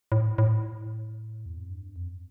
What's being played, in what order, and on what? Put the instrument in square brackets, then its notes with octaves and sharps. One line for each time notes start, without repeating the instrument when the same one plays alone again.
[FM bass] A2
A2
E2
F2
G2
F2